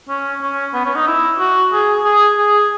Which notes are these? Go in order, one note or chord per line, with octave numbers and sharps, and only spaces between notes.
C#4
C#4
B3
C#4
D#4
E4
F#4
G#4
G#4
G#4